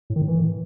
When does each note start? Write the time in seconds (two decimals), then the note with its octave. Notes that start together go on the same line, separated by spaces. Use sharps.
0.10 A2
0.16 D#3
0.22 A2
0.28 E3